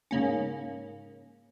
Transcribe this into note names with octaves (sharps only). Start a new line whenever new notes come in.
G#2 C#3 A#3 C#4